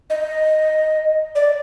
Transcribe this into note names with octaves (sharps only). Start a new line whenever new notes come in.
D#5
D5